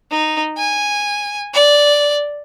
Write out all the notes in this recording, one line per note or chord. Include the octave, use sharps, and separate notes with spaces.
D#4
G#5
D5